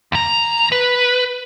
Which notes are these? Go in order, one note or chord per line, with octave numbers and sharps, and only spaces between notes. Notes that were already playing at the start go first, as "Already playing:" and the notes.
D#2 A#5
B4